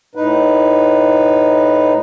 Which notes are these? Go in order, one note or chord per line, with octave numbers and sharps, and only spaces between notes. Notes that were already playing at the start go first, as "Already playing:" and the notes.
A2 D#4 B4